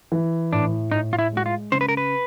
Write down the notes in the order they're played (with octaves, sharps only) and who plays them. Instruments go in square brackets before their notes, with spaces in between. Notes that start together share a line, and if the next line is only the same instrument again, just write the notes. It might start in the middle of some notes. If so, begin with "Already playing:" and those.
[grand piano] E3
[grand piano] A2 [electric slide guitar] D4
[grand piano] A2 [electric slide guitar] D#4
[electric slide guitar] F4
E4
[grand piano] G#3 [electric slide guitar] F#4
[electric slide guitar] F4
[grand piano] C#3 [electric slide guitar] C5
[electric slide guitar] B4
A#4
B4